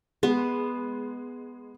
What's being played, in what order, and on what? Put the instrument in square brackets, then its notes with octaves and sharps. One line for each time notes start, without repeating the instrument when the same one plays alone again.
[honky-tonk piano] G#3 [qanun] B3